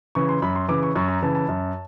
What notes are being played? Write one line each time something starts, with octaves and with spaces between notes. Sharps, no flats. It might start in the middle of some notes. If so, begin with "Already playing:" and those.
C#3 E3 C#6
C6
F#2 B5
C6
C#3 E3 D6
C#6
F#2 C#6
A#5
C#3 E3 A5
A5
F#2